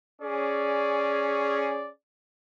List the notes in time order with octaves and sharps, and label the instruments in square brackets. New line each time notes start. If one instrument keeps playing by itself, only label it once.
[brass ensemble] C#4 G#4 [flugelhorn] D5